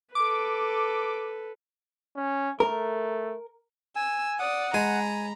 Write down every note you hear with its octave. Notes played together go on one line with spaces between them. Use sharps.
A4 B4 D6
C#4
A3 A#4
G#5 E6
D5 F#5 D#6
G#3 G#5 A#5 B5